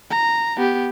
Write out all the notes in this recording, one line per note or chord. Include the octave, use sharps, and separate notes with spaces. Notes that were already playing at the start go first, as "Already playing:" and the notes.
A#5
B3 G4